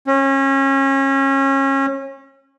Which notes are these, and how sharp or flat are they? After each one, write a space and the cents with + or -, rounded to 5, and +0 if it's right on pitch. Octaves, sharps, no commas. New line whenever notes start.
C#4 -30